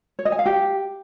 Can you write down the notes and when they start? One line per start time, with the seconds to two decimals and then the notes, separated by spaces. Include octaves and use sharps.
0.19 C#5
0.25 D#5
0.32 G#5
0.39 F5
0.46 G4